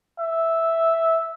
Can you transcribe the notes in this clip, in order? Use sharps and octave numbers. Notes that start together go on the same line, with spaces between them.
E5